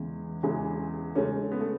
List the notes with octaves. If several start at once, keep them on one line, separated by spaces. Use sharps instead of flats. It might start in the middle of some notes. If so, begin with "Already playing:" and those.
Already playing: E2 C#3 E3 G#3
E2 C#3 E3 G#3
C#2 C#3 G#3 A3 C#4
B3
A3